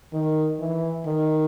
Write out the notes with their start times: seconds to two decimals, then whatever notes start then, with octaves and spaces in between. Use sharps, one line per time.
0.13 D#3
0.59 E3
1.06 D#3